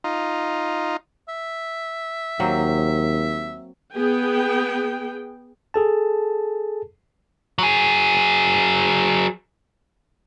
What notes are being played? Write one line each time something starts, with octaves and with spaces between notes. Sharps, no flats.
D#4 F4
E5
D#2 F#3 A#3 C4
B3 G#4 G5
G#4 A4 A5
F#3 G#4